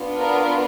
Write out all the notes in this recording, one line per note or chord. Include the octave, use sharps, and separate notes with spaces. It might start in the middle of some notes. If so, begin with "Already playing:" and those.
Already playing: B3 D4 F4
A#4